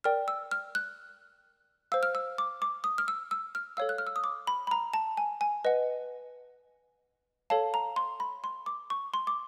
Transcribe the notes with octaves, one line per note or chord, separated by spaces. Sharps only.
A#4 D5 G5 F6
E6
F6
F#6
C5 F5 E6
F6
E6
D6
D6
D#6
F6
E6
E6
F6
A4 C#5 F5 E6
F#6
F6
E6
D#6
D6
B5
B5
A#5
A5
G#5
G#5
B4 D#5 F#5
A4 C#5 F5 A5
A#5
C6
B5
C6
D6
C#6
C6
D6